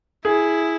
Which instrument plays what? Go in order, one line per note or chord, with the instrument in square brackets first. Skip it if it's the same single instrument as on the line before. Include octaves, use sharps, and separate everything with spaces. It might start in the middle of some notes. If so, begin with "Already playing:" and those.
[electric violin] E4 [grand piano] G#4